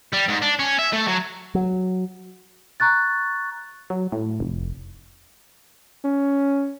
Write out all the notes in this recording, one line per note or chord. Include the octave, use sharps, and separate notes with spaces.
G3
G#2
D4
C#4
E5
A3
F#3
F#3
A#5 C#6 F#6 A6
F#3
A2
F1
C#4